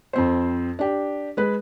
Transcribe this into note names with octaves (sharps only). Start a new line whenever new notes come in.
F2 C4 C5
D4 G4
G#3 B4